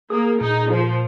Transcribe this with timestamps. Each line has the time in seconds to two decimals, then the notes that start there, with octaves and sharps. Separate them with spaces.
0.10 A#3 G#4
0.41 A#2 D#4
0.70 F3 C5